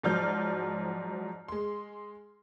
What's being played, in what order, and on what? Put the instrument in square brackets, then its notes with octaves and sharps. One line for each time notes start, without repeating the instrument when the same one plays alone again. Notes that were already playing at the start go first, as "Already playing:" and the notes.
[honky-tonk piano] G#2 F3 F#3 D5 F6 G6
G#3 C6